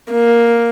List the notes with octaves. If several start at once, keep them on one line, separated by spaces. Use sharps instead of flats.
A#3